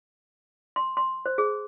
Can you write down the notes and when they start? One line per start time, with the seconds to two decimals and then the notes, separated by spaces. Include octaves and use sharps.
0.76 C6
0.97 C6
1.26 C5
1.38 G#4